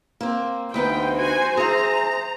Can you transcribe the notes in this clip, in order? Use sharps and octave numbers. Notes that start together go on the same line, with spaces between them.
A#3 C4
D2 B3 D#4 C5 G5
F#4 G#5
G#4 E5 A#5